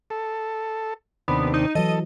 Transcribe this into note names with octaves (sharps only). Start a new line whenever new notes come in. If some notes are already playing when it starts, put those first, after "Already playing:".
A4
D#2 C3 B3 D4
D#4
E3 F#3 A4 D#5